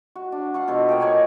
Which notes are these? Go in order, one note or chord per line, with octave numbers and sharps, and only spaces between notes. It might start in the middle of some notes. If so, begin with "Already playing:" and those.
F#4
D4
F5 F#5 C#6
B2 F3 A4
A#3 D#5 G5
C#5 F#5 G#5